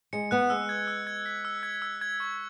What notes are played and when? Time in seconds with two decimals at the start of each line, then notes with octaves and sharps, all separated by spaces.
0.13 G#3 C#7
0.31 B3 F#6
0.50 G#3 E6
0.69 G#6
0.88 E6
1.07 G#6
1.26 B6
1.45 E6
1.63 G#6
1.82 E6
2.01 G#6
2.20 C#6